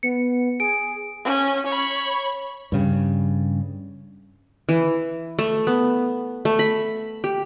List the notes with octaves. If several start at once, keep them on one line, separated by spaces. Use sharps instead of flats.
B3 C#7
G#4 D7
C#4
C#5 B5
G2 C#3 G3
E3
A3
B3
A3
B5
G4